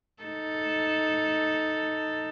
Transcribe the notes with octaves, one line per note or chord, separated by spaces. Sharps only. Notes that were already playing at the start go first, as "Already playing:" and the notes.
D#4 A4